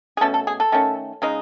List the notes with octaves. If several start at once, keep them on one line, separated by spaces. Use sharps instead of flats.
G#4
B2 A3 C#4 A4
A4
G#4
A4
D#3 A3 C#4
C#3 G#3 D#4